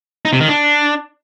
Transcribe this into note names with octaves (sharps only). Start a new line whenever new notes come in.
D#4
C3
D#3
D4